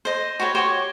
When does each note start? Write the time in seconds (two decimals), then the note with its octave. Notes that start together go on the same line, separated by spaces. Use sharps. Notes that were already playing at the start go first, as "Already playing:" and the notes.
0.05 C5 D#5
0.40 F#4 G4 B4 C#5
0.55 F#4 G4 C5 C#5